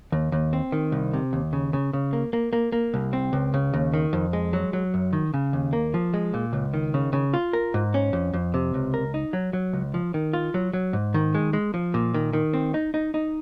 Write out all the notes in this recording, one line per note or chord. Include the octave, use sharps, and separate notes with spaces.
D#2
D#2
C4
D#3
C2
C3
D#2
C#3
C#3
C#3
A#3
A#3
A#3
A#3
C2
C4
C#2
C#3
D#2
D#3
F2
G#3
F#3
F#3
F#2
D#3
C#3
D#2
A#3
F3
G#3
A#2
C#2
D#3
C#3
C#3
F4
A#4
G#2
C#4
F2
F2
C3
C#2
A#4
D#4
F#3
F#3
C#2
F3
D#3
F4
F#3
F#3
G#2
D#3
G#3
G#3
F3
A#2
D#3
D#3
C4
D#4
D#4
D#4